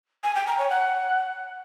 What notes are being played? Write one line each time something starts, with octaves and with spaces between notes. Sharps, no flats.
G#5
G5
A#5
C#5
F#5